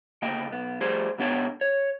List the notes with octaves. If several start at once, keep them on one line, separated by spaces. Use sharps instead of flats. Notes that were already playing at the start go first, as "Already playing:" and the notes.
D2 C#3 A#3 D#5 G5
B1 B3
F3 G3 A3 G#4 C5
G2 C3 B3 D4 C#5 G5
C#5